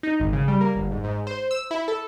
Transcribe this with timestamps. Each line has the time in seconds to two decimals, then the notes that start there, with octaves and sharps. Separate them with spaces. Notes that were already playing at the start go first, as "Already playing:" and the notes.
0.03 D#4
0.20 G#1
0.33 C#3
0.48 G3
0.61 A#3
0.76 G1
0.91 G#2
1.04 G#2
1.27 C5
1.51 E6
1.71 E4
1.88 A4